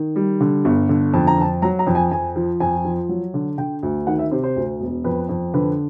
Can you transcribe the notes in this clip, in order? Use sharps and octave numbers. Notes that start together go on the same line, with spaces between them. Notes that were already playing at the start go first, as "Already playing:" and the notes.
Already playing: D#3
G3
D3
G1
D3
F2 A5
A#5
F2 A5
F#3 A#5
A#5
F2
G#5
F2 G#5
F3
F2 G#5
F3
F#3
D3
D3 G5
D2
D#3 F#5
E5
C3 C5
C5
D2
E1
F2 B4
F2
D3 B4